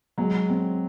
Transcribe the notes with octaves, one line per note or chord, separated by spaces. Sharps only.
F#3 G#3
C4